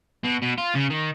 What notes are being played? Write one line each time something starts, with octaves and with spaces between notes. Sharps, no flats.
B2
B2
F4
C#3
D#3